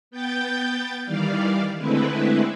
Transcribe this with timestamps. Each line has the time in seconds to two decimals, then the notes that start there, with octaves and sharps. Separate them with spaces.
0.11 B3 G5 G6 A6
1.05 D#3 E3 G3 D5 F5
1.77 D3 G#3 A3 C4 E4 B4